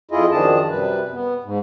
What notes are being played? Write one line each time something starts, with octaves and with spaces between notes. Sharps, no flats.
F2 E4 F4 G#4 D#5
F#2 D#3 F3 D4 G#4 A5
F#2 C3 G3 B4
B3
G#2